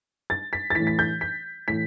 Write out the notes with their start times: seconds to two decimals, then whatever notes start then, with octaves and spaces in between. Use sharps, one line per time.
0.30 A6
0.53 B6
0.70 A6
0.75 E3 B6
0.80 A2
0.87 B6
0.99 G6
1.21 B6
1.68 A2 E3 B6